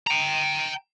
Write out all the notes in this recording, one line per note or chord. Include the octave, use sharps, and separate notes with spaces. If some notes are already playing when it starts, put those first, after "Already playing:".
G5 A#5